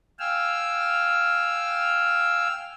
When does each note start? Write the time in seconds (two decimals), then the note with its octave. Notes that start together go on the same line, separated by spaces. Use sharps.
0.19 F5 G5 G#5 E6 F6